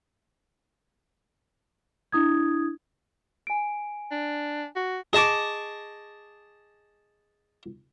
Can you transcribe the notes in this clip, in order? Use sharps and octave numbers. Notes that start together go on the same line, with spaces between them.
D4 E4 D#6 G#6
G#5 D7
D4
F#4
G#4 D#5 A5 C#6 D6